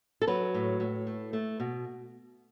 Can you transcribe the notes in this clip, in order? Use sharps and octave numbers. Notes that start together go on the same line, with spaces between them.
A4
F#3 B4
A2
A2
A3
A3
B2